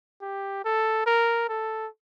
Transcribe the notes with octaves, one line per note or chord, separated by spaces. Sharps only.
G4
A4
A#4
A4